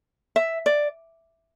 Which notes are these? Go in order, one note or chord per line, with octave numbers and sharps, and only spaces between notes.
E5
D5